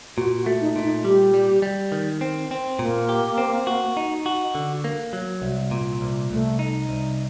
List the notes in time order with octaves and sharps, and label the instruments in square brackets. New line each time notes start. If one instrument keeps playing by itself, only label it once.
[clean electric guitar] A#2 [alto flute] F#4
[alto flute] F#4
[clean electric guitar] A3
[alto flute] D#4
[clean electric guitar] A#2
[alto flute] D#4
[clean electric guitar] G3 [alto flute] G4
[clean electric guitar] G3
G3
D#3
C4
C4
[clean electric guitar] A#2 [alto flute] A#3
[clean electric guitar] G4
C4
F#4
D#4
F#4
D3
A#3
F#3
C2
A#2
C2
[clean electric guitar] C2 [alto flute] A3
[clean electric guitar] D#4
C2